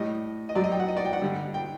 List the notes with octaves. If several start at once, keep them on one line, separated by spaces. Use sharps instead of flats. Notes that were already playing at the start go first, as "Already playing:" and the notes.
Already playing: A2 G3 D#5
D#5
F#2 F#3 D5
D#5
G5
F#5
D#5
D5
G5
F#5
G2 D3 G3
G5